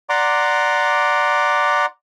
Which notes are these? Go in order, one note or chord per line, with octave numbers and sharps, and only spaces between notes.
D5 F#5 A#5 C6 D6